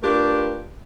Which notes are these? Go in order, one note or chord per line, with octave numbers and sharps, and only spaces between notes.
A3 D4 F4 G4 A#4 B4